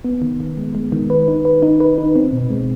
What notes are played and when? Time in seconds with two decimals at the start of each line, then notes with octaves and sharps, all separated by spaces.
0.05 B3
0.22 D#3
0.40 D#3
0.58 G#3
0.75 G#3
0.92 D#3
1.10 B4
1.28 D#4
1.45 B4
1.62 D#4
1.80 B4
1.98 D#4
2.16 C4
2.33 B2
2.50 G#3